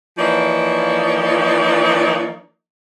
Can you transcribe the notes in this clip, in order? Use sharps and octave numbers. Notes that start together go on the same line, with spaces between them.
E3 F3 A#3 D#4 C#5 D5